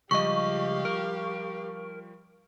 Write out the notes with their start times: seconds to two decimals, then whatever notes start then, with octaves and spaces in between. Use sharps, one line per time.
0.11 C#2 F3 G3 G4 D#5 F5 C#6
0.85 A#4